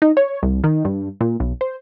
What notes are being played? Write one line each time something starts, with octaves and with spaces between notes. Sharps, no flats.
D#4
C#5
C2
D#3
G2
A#2
B1
C5